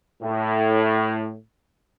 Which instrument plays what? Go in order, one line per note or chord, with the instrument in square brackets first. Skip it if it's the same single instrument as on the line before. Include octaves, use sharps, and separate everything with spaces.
[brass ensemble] A2